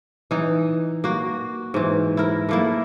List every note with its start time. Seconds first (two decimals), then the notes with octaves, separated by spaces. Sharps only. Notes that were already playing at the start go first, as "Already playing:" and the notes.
0.31 E3 D#4
1.04 A#3 F#4
1.74 G#2 E3
2.17 E4 A#4
2.49 A3 A#3 E4